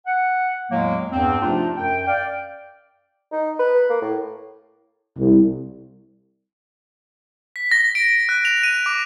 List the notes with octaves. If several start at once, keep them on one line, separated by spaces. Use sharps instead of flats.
F#5
E2 A2 F#3 G#3 A#3
E2 G2 C4
C3 F3 A3 D4 D#4 F4
F#2 G5
D5 F5 G5
D#4
B4
A#3
A2
C2
B6
A#6
D7
F#6
F7
D#7
D6